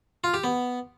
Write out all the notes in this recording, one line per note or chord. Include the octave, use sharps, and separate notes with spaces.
F4
G4
B3